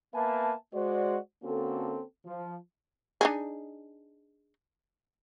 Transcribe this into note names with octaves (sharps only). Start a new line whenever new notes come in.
A#3 B3 B4 E5 G#5 A5
G#3 F#4 C5 D5
D3 A#3 C4 C#4 F#4 A4
F3
D4 D#4 G#4